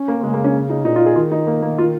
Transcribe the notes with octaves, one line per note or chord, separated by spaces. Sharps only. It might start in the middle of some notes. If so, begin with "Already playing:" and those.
Already playing: C#4
A#3
C#3 G#3
A#3
C#4
D#4
A#2 D#4
F4
G#4
D#3 F4
D#4
A#3
A#3
F4